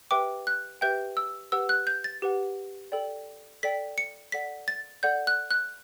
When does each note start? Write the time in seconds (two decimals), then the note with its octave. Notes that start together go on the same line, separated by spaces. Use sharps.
0.11 G4 B4 E5 G5 D6
0.47 F#6
0.81 G4 B4 E5 G5 G6
1.17 E6
1.52 G4 B4 F#5 E6
1.69 F#6
1.87 G6
2.04 A6
2.22 G4 B4 F#5
2.92 A4 D5 G5
3.63 A4 D5 G5 B6
3.98 C#7
4.32 A4 D5 F#5 B6
4.68 A6
5.03 A4 D5 F#5 G6
5.27 F#6
5.51 F#6